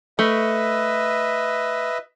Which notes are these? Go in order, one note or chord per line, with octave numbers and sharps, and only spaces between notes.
A3 B4 D#5 E5